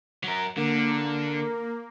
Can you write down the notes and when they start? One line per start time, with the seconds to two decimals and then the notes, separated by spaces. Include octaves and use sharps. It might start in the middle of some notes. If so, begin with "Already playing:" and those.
0.24 F#3 A#4
0.57 D3 A#3